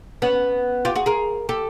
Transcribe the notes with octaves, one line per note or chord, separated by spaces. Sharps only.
B3 C#4
F4 G4
F#4 G#4
G#4 A#4
G4 A4